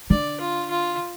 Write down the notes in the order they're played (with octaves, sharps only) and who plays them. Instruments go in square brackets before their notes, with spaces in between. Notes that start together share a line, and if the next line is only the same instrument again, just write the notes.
[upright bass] D3 [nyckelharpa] D5
[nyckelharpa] F4
F4